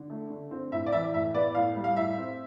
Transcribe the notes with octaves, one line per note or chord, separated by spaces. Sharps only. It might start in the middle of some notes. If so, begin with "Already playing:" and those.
Already playing: D3
A3
D3
C4
A2 E5
D5
E3 E5
A2 E5
B3 D5
A2 F5
G3
F5
A2 E5
C4